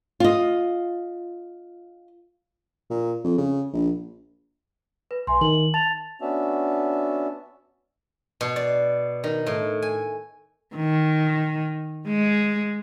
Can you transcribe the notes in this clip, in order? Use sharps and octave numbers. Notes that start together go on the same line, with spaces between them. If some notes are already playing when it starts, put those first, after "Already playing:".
F4 D#5
A#2
F2
C#3
A#1
B4
B1 E5 G#5 C6
D#3 F#7
A5 A6 F7
B3 C#4 D4 F#4 E5 A5
B2
D5
D#3
A2
G#5
D#3
G#3